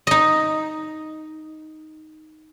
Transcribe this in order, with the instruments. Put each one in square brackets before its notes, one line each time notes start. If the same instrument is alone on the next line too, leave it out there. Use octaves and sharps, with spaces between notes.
[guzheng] D#4 D#5